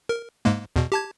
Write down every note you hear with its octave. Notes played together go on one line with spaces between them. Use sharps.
A#4
G#2 G#3 A#3
E2 B2
G4 A5 G#6